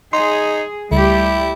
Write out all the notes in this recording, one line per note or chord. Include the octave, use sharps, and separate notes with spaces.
D#4 G#4 C6
C#2 G3 A3 E4 G4